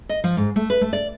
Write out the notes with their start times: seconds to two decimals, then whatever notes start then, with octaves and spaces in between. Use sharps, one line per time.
0.09 D#5
0.24 F3
0.37 G#2
0.56 A3
0.70 B4
0.81 A3
0.93 D5